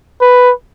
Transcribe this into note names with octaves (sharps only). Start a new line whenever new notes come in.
B4